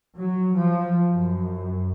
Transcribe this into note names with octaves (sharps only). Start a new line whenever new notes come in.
F#3
F3
F#2